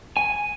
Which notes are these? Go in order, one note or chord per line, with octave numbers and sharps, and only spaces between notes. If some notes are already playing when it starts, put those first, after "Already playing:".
G#5